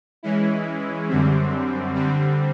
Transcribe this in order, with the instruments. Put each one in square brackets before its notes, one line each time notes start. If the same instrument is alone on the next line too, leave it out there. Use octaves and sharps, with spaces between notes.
[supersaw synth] E3 G#3 C#4 E4
F#2 D3 G3 C4
D3 G3 C4